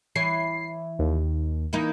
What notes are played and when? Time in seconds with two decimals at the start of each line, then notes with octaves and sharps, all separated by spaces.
0.16 E3 C#5 C7
0.99 D#2
1.73 E3 A#3 D#4